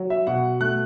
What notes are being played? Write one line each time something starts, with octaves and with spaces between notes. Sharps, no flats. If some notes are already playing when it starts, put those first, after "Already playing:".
Already playing: F#3
E5
B2 F#5
A3 F#6